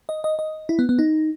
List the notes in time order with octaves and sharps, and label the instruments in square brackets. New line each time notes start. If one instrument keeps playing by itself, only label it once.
[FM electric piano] D#5
D#5
D#5
E4
B3
B3
D#4